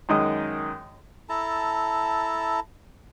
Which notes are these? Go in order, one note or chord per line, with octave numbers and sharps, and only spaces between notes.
F#2 D#3 G#3 D#5 D#6
E4 A4 A5 A#5